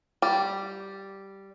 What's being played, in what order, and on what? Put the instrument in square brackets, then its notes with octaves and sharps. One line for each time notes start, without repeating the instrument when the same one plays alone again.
[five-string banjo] G3